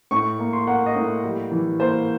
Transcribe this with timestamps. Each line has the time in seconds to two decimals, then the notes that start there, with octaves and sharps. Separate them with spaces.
0.11 A2 C#6
0.39 A#3
0.53 C6
0.67 A#3 F#5
0.86 D#5
0.95 A2
1.24 G3
1.51 E3
1.80 A#3 C5